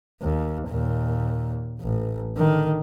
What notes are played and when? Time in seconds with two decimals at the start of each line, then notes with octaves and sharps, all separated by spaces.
0.22 D#2
0.68 D#2 A#2
1.81 A1
2.37 D3 D#3